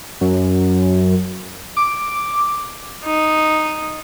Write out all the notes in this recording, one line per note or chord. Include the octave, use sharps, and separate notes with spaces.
F#2
D6
D#4